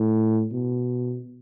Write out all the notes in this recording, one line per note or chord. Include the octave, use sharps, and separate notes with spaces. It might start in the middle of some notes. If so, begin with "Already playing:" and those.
Already playing: A2
B2